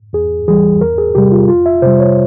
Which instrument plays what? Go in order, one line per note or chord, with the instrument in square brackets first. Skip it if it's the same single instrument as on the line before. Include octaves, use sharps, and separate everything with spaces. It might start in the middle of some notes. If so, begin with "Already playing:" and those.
[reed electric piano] E2 G#4
E3 G3 G#4
E2 A#4
G#4
C3 G3 G4
F4
F2 F4
E5
C3 G3 C5
C#5